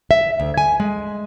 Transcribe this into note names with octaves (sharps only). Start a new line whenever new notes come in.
E5
D2
G#5
G#3